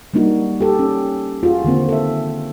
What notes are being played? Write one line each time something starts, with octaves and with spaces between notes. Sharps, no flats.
G3 A#3 D4 D#4 F#4
G4 A4
C#4
F4 F#4 G#4
D3 D#3 A#3 C4
A4 E5